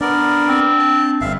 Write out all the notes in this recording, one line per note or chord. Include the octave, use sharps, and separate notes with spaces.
B3 D4 A#4 D5
C4
A5
G1 G2 E5 F5